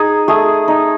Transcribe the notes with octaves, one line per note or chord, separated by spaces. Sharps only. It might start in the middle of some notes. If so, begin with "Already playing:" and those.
Already playing: D#4 G#4
A3 G#4
D#4